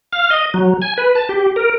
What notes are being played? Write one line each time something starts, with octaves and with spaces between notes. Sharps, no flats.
F5
D#5
F#3
G#5
B4
A5
G4
A#4